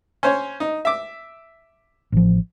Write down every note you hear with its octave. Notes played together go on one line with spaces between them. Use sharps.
C#4 C5 C#5
D#4
E5 D6
A1 F3